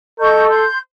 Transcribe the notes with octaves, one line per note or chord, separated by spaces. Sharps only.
A4 D#5 C#6 G6
C6 G6